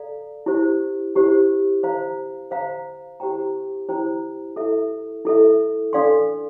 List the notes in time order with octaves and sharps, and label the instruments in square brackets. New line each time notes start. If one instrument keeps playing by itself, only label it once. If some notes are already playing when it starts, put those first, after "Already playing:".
Already playing: [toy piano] A4 D5 F5 A#5
E4 G4 C5
E4 G4 C5
C5 F5 A#5
C5 F5 A#5
E4 G4 C5 G5 A#5
E4 G4 C5 G5 A#5
E4 A4 E5
E4 A4 E5
D4 A4 D5 F5 C6